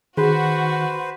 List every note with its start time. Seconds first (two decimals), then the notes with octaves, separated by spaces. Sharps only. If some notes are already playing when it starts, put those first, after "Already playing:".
0.17 D#3 F#4 G#4 B4 C5